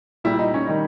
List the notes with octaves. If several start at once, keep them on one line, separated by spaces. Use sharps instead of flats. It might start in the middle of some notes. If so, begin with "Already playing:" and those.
A#2 G3 E4
D#4
C#4
D#3 G3 D#4